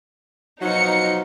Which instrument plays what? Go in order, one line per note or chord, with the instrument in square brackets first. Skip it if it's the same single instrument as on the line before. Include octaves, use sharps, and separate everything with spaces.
[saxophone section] B2 F3 F#3 [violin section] D#4 C#7